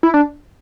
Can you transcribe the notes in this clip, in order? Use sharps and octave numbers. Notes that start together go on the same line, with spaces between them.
E4
D4